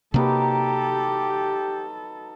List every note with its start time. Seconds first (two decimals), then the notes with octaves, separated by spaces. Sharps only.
0.14 C3 F#3 A#3 D#4 G4 A4 B4